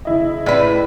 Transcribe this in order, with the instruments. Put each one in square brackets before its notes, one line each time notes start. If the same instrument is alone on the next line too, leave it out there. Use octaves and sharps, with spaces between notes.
[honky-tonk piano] F#1 E4 D#5
[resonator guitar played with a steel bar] A2 B4 [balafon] D5